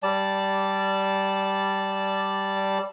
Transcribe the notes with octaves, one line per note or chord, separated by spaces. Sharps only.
G3 D5 A5